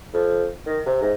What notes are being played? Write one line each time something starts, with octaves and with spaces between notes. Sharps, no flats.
F2
D#3
C3
G#2